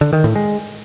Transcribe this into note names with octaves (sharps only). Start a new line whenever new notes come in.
D3
D#3
A2
G#3